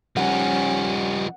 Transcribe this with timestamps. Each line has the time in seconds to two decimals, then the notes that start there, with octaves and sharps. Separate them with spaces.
0.17 F3 G3 C#4 D#4 F#5